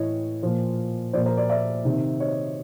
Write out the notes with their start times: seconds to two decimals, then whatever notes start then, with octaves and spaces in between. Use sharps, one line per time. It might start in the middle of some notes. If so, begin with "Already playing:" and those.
Already playing: A2 E3 C#5 D#5
0.43 A#2 F3
1.13 F3 C5 D5
1.17 A#2
1.26 A#4 C5
1.37 C5 D5
1.49 D5 E5
1.85 C3 D#3
2.20 C#5 D#5